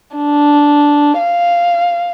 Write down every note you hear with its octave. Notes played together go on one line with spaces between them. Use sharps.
D4
F5